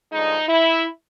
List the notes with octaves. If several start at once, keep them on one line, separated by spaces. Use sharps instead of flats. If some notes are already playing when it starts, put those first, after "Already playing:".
G2 D3 F3 G#3 D#4
E4